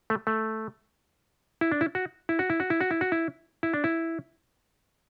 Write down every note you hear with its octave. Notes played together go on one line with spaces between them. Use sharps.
A3
A3
E4
D4
E4
F#4
E4
F#4
E4
F#4
E4
F#4
E4
F#4
E4
E4
D4
E4